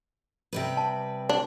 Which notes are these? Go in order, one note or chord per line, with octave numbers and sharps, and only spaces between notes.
C3 G3 B4
A5
D4